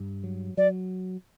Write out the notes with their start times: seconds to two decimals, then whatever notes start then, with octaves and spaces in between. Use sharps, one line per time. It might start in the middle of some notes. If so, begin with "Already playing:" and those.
Already playing: G2
0.24 F#3
0.57 F#3 D5